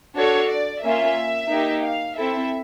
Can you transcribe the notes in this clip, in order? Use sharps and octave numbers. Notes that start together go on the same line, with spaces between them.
D4 F#4 A4 C#5
D5
A#3 C#4 F4 E5
A#3 D#4 G4
F5
C4 E4 A4 E5